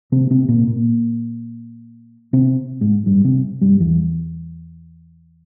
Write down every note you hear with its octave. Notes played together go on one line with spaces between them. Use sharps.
C3 C4
C3 C4
A#2 A#3
A#2 A#3
C3 C4
G#2 G#3
G2 G3
C3 C4
G2 G3
E2 E3